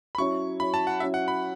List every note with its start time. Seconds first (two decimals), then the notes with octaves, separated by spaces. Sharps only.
0.15 B5
0.18 F#3 C#4 E4 C#5 C#6
0.60 F#3 C#4 E4 C#5 B5
0.74 A5
0.87 F#5
1.00 F#3 C#4 E4 C#5 E5
1.14 F#5
1.28 B5